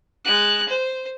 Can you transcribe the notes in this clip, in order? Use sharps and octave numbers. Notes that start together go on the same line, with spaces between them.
G#3 F#6
C5